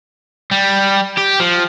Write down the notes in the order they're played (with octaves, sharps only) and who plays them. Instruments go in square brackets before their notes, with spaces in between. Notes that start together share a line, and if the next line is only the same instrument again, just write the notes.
[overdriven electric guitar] G3
G4
F3